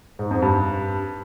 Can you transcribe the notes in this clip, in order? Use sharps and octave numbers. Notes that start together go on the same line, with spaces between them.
G#2
F2
G2